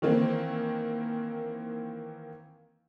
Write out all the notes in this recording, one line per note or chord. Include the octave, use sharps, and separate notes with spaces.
D#3 E3 A#3 C4